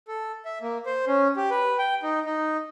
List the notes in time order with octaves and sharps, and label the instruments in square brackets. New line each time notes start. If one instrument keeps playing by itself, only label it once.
[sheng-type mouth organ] A4
E5
A#3
C5
C#4
G4
B4
G5
D#4
D#4